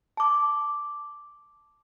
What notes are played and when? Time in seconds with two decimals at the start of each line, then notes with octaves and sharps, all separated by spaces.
0.17 A5 D6